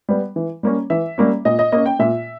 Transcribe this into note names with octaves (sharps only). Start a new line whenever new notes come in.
G3 B3
E3
G3 A#3 C#4
E3 E5
G3 A#3 C#4
A#2 D#5
D#5
A#3 C#4 D#5
G5
A#2 E5